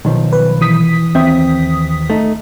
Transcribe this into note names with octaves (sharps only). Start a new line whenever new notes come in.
B1 D#3 F3
B4
E3 D#6 B6
D#2 C4 E5
A3 D#4